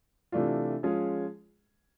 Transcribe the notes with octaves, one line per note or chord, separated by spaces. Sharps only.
C3 E3 A3 D4 F4
F3 G#3 C#4 F4 G#4